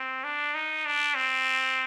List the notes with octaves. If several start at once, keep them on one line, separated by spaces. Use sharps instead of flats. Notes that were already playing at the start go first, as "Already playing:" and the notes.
Already playing: C4
D4
D#4
D4
C4